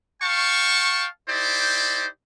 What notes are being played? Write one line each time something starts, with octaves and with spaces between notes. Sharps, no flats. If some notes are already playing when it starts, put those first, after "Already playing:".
F5 G5 A5 C#6
D#4 E4 G4 C5 D5